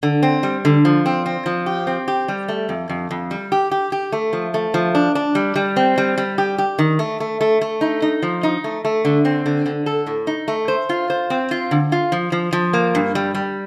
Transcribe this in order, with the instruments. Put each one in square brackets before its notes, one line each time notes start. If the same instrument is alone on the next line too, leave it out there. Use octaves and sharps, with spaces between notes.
[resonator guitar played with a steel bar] D3
C4
G3
D3
F3
C4
C4
F3
G4
C4
G4
G3
A3
F2
F2
F2
G3
G4
G4
G4
A3
F3
A3
F3
D4
D4
G3
G3
C4
G3
G3
G4
G4
D#3
A3
A3
A3
A3
D#4
D#4
F3
D#4
A3
A3
D3
C4
D3
D3
A4
A2
D#4
A3
C5
F4
C5
C4
F4
D3
F4
F3
F3
F3
A#3
G2
G3
G3